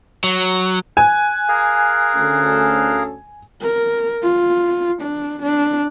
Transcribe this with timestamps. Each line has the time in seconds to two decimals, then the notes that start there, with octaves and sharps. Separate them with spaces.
0.24 F#3
0.97 G#5 F#6
1.49 G#4 A#4 F5
2.14 D2 C#4 A4
3.61 A#4
4.23 F4
5.02 D4
5.43 D4